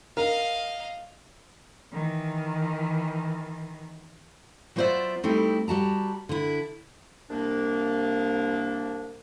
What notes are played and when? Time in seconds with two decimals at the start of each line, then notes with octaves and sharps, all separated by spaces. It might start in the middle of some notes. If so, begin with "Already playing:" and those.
0.17 A#4 D#5 F5
1.93 D#3 E3
4.76 F#3 B3 F4 C5 D5 E5
5.23 G3 A3 C4 D#4 E4
5.68 G3 F#4 A5 A#5
6.29 D3 E4
7.30 C2 A#3 D4